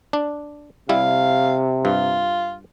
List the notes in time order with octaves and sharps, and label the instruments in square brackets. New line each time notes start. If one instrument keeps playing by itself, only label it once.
[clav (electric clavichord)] D4
[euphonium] C3 [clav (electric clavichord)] G3 E4 [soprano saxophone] F5
[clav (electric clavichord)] G2 [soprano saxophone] F4